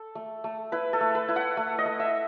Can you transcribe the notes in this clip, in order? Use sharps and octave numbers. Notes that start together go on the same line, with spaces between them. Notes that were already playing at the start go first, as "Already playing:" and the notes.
Already playing: A4
A3
A3
E4 B4
A4
A3
B4
E4
F#5
A3
D#5
A3
E5